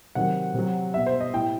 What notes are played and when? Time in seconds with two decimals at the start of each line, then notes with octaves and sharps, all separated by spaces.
0.15 C3 D#3 F#3 F#5
0.54 C3 F#3
0.94 B2 G3 E5
1.06 C5
1.20 D#5
1.33 A2 G3 G5